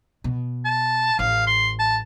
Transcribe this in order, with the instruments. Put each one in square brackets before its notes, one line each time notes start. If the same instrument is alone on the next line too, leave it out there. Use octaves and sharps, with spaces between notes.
[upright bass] B2
[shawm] A5
[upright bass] A1 [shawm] F5
[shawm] C6
A5